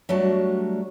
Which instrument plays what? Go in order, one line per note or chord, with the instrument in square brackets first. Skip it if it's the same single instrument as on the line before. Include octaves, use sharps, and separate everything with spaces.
[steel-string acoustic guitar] F#3 G3 A3 D4 F#4 A5